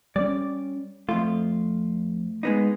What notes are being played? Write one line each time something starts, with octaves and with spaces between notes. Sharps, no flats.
G3 A3 C#4 D5
F2 A3 F4
G#3 B3 D#4